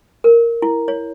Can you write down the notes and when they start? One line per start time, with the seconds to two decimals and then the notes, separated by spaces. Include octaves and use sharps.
0.24 A#4
0.62 E4
0.88 C#5